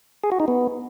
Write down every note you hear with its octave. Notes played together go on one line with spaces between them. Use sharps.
G#4
F#4
D#4
B3